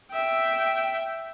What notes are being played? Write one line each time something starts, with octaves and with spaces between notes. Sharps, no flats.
E5 G5